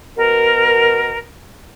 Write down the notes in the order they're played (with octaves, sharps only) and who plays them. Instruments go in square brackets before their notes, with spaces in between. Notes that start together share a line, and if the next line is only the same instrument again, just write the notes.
[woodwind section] B2 A#4